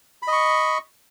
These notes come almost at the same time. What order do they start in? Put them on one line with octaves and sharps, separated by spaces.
B5 D#5 C#6